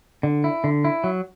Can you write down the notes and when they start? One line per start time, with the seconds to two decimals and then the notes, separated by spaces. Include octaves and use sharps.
0.23 D3
0.44 E4
0.64 D3
0.85 E4
1.04 F#3